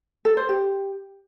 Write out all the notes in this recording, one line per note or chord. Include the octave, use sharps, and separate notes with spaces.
A4
C5
G4